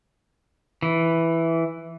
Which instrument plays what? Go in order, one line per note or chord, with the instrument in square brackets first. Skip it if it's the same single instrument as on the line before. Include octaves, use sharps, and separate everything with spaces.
[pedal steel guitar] E3